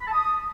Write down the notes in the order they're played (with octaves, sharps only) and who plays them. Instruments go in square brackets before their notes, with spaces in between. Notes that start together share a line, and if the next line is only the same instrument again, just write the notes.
[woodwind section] B5
A5
D#6